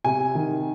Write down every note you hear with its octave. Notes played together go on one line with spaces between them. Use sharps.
C3 G#5
D#3